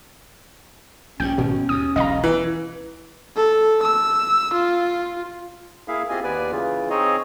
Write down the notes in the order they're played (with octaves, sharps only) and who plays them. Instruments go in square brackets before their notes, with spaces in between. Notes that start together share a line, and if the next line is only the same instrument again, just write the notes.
[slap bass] A#1 G2 [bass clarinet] C#4 [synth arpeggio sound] G5
[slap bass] G#1 [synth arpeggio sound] B2
[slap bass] D#2 [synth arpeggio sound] D#6
[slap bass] E1 B1 E2 [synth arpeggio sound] D#5 F5 A#5
[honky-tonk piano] E3
[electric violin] A4
E6
F4
[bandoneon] A#3 E4 G#4 E5 F5
C4 F4 G4 G#4 D#5 G#5
D#2 B3 B4 D5 G#5
C#3 E3 F4
C4 D#4 G#4 C#5 D#5